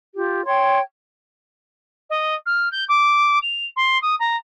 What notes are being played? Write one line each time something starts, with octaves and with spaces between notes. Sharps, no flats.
F4 G4
C#5 G5 C6 G#6
D#5
F6
G6
D6
F7
C6
D#6
A#5